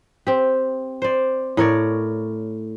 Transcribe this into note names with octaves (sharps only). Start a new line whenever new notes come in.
C4 G4
C5 D5
A2 A#4 C#5 D5